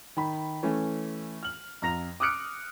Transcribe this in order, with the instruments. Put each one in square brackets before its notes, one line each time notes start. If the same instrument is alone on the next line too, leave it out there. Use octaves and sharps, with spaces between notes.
[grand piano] D#3 B5
E3 A3 C#4
F6 F#7
F2 A#5 A#6 F7
D6 D#6 F6 F#6 C#7 D7